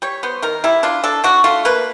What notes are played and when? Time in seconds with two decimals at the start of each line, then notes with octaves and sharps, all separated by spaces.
0.02 G3 C#5
0.23 B3 C5
0.42 D#3 A#4
0.64 G3 E4
0.83 D4 F4
1.04 D4 A4
1.24 D4 F#4
1.44 A3 F4
1.65 A#3 B4